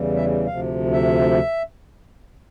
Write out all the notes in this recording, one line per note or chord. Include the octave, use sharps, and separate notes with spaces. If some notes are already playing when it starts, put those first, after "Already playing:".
Already playing: E2 C#3 E3 G3
E5
D2 C3 F3 F5
E5